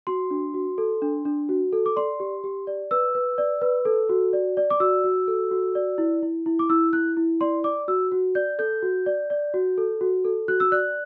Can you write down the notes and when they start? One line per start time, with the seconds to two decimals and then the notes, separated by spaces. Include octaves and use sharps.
0.07 F#4 C6
0.31 D4
0.54 F#4
0.78 A4
1.02 D4
1.25 D4
1.49 F#4
1.73 A4
1.86 D6
1.96 D5 C6
2.20 G4
2.44 G4
2.67 D5
2.91 B4 E6
3.15 B4
3.38 D5
3.61 B4
3.85 A4
4.09 F#4
4.33 D5
4.57 D5
4.70 D6
4.80 F#4 E6
5.04 F#4
5.28 A4
5.51 F#4
5.75 D5
5.98 E4
6.22 E4
6.46 E4
6.59 D6
6.70 E4 E6
6.93 E4 F#6
7.17 E4
7.41 D5 C6
7.64 D5 D6
7.88 F#4 E6
8.12 F#4
8.35 D5 G6
8.59 A4 G6
8.83 F#4
9.06 D5
9.30 D5
9.54 F#4
9.78 A4
10.01 F#4
10.25 A4
10.48 F#4 F#6
10.60 E6
10.72 D5 F#6